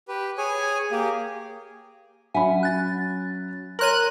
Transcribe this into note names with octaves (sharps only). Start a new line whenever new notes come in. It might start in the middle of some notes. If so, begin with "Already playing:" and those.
G4 B4
G#4 C#5 G#5
A#3 G4 G#4
F#3 C#4 E5 F#5 G#5 B5
F#6 A6
A#4 C#5 C6 F#6 D#7 F#7